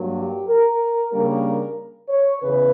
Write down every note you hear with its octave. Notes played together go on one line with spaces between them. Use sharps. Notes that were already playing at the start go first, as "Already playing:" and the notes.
Already playing: G2 F#3 A#3
G4
A#4
C#3 G3 A#3 D4 A#4
C#5
E2 C#3 B4